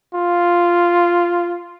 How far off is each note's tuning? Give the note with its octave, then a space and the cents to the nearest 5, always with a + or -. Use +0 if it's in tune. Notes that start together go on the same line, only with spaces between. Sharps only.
F4 -5